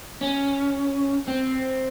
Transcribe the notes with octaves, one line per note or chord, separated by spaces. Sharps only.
C#4
C4